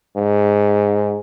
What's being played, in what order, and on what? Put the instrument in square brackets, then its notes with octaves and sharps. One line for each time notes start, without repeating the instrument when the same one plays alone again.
[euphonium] G#2